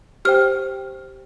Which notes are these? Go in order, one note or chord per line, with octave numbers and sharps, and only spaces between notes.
G4 C5 G5 F6